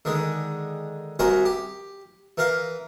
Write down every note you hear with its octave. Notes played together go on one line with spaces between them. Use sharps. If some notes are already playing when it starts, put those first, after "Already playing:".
D3 D#3 G#3
C2 F#4 A#4 G#5 C6 C#6
G4
E3 A#4 F5